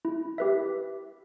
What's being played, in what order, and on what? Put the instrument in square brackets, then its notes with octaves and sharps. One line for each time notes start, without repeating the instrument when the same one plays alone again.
[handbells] E4
G4 B4 E5